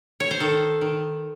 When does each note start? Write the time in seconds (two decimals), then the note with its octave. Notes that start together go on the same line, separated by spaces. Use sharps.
0.20 C#5
0.31 C5
0.40 D#3 A4
0.81 D#3